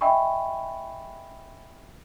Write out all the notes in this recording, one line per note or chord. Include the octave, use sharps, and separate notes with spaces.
D#5 E5 G5 G#5 B5 C#6